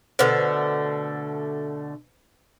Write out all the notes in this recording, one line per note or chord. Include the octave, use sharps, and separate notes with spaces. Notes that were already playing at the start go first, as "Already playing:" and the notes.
B2 D3 A3 B4 C5